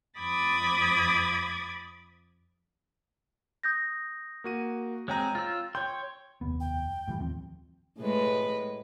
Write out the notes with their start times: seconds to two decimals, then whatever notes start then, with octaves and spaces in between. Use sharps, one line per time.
0.19 F2 B5 D6 D#6 G#6 A6
3.63 D#6 G6 A#6
4.44 A#3 F#4 D#7
5.08 G#3 C4 G#4 C#5 G5 A#5
5.35 F4 E6
5.75 C#5 G5 C6 G6
6.41 F1 D#2 B3
6.60 G5
7.08 A2 E3 G3
7.19 D#2 F3 C4
7.99 A2 G#3 B4